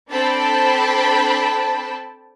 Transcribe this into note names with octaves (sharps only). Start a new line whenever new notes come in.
C4 D4 A4 G5 A5 B5